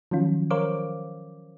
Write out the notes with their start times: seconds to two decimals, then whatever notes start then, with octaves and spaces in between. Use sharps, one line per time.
0.11 D#3 F3 F#3 C#4 F4
0.51 A#4 C5 C#5 F5 D6